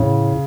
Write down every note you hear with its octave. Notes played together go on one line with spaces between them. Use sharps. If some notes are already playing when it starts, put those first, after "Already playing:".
Already playing: A2 C#3